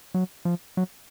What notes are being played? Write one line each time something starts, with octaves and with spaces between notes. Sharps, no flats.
F#3
F3
F#3